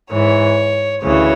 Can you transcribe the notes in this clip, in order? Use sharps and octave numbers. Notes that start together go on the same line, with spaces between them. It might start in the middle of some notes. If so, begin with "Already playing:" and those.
G#2 E3 C#5
D2 C#3 E3 C#5